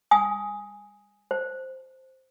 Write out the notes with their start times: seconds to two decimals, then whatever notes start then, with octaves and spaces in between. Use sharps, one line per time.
0.11 G#5 D#6
1.31 C5